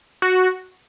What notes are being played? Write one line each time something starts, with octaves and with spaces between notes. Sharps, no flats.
F#4